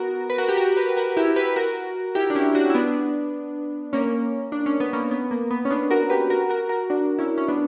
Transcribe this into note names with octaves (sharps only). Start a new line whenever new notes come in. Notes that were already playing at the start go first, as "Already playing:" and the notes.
Already playing: B3 F#4 A#4
B4
F#4 A#4
G4
F#4 A#4
G4 B4
B4
F#4 A#4
E4 G4
G4 B4
F#4 A#4
E4 G4
D4
C#4 E4
D4 F#4
E4
B3 D4
A#3 C#4
D4
C#4
B3
A#3 C#4
B3
A#3
B3
C#4
B3 D4
F#4 A#4
G4 B4
F#4 A#4
F#4 A#4
F#4 A#4
D4 F#4
C#4 E4
C#4
B3 D4